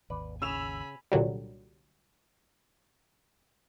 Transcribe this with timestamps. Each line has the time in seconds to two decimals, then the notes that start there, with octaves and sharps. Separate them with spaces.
0.10 G#1 D#2 B4 D5
0.42 C#3 G#5 B5 E6 E7 F7
1.12 C2 A#2 D3 F#3 G3